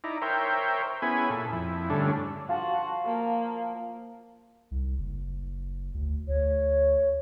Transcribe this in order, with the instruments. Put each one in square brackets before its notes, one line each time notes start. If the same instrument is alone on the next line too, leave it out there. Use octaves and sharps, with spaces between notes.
[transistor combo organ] D#4 E4 D5 A#5
A#4 C5 C#5 E5 G5
B3 C#4 E4 G#4 G#5 B5
A#2 A4
F2 E4
G2 D3 A3 C#4 D4
[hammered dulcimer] F3 A5 [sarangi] F#4 [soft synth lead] F5
[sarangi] A#3
[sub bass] C2
F#1
D2
[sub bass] D2 [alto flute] C#5